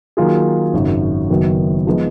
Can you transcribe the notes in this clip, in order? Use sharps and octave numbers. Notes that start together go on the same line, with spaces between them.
D#3 F#3 A#3 F4 G#4
G#1 F#2 C#3
F#1 F#2 D#3 F#3 B3
F3 G#3 B3 D#4